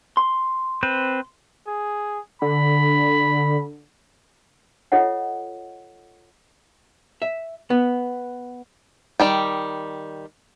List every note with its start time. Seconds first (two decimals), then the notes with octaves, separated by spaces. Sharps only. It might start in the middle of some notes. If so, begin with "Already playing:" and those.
0.17 C6
0.83 C4 B4 C5
1.67 G#4
2.42 D3 B5
4.92 F4 A4 C#5 D#5 F#5
7.22 E5
7.70 B3
9.20 D#3 G3 G5